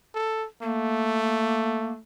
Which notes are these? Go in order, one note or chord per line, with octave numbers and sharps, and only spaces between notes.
A4
A3 A#3